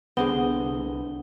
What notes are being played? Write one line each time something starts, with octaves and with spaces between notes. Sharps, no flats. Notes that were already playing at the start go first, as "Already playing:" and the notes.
C2 D3 G#3 B3 C4 D4 F#5 G7